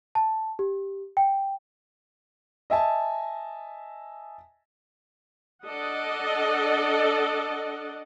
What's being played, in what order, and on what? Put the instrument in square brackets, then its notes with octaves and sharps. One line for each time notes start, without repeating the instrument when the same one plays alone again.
[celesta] A5
G4
G5
[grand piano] D#5 E5 G#5 A5
[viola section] D4 A4 D5 D#5 F#5